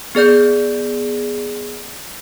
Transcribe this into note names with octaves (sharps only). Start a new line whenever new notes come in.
B3 G#4 D5 G6